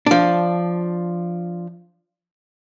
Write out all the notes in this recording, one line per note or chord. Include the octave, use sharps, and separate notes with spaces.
F3 D4